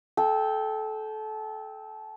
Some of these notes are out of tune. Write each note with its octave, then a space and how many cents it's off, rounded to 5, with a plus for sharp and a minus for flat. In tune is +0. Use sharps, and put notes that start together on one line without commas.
A4 -25 G5 +0